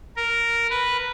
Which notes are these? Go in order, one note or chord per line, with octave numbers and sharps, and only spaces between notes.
A#4
B4